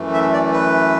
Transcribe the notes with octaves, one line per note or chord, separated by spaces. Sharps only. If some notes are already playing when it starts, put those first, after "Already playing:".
Already playing: F#2 E3 A3
E5
D5
B4